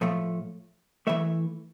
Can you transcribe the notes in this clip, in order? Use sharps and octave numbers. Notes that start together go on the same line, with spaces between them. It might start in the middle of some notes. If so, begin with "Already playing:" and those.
A2 F3 A3
E3 A3 E5